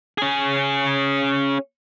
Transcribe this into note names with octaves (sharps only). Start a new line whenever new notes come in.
C#4 G#4